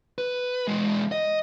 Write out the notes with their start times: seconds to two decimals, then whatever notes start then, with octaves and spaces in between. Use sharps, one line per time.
0.18 B4
0.67 E2 G#3
1.12 D#5